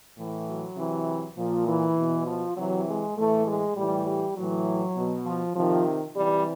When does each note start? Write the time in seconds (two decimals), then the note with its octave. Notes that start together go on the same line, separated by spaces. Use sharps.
0.18 A2 E3
0.47 F#3
0.77 C3 E3
1.37 A#2 F3
1.67 E3
1.97 B2
2.27 F3
2.57 C3 E3 F#3
2.86 G#3
3.16 A2 E3 A3
3.47 G#3
3.77 A2 E3 G3
4.07 G3
4.36 A2 E3 F#3
4.96 B2
5.26 F3
5.56 C3 D#3 F3
6.16 C3 E3 G3